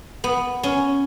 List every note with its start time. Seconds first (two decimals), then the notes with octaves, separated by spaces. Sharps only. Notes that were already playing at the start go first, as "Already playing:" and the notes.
0.24 B3
0.63 C#4